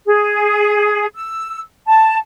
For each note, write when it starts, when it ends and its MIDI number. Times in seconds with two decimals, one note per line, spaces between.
0.06 1.05 68
1.15 1.60 88
1.87 2.18 81